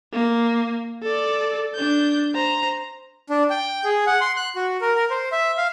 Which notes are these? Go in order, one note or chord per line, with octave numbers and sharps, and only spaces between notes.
A#3
A4 D5
D4 G6
C5 A#5
D4
G5
G#4
F#5
C6
F#6
F#4
A#4
A#4
C5
E5
F5